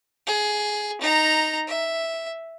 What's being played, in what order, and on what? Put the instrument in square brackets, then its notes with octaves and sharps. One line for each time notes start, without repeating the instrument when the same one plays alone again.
[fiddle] G#4
D#4 A#5
E5